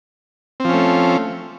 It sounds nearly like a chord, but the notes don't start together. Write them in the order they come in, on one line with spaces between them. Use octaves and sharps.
C4 F3 C#4 A3